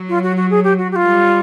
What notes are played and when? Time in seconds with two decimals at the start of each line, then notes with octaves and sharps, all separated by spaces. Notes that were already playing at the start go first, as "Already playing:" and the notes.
Already playing: F#3
0.08 F4
0.22 F#4
0.36 F#4
0.50 G#4
0.63 G4
0.78 F#4
0.91 G4
0.95 F4
1.04 G3